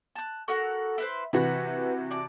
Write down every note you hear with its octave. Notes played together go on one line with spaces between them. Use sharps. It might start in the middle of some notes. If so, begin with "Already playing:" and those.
A5 F#6
F#4 A4 A#4 F#5
E4 B4 C5
C3 E3 F#4 B4 F#5 B5
D5 A5